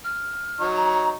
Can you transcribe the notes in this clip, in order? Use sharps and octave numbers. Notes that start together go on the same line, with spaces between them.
F6
F#3 D#4 C#6
A#5